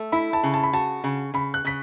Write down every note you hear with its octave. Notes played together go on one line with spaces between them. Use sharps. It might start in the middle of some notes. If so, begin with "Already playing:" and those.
Already playing: A3
E4 B5
A5
C#3
A5
B5
F#4 A5
C#3
C#3 B5
F#6
C#3 B6